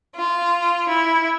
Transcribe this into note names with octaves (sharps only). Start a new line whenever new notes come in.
F4
E4